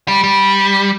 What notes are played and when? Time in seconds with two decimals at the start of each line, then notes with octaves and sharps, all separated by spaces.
0.08 G3
0.24 G3